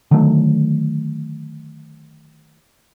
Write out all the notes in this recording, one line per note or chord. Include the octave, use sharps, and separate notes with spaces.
D3 D#3 F#3 A3